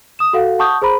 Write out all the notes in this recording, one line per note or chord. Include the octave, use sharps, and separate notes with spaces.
D#6 E7
F#4 A4 F5 F#5
F#5 A5 C#6 D#6 G6
G#4 C5 A#5 B5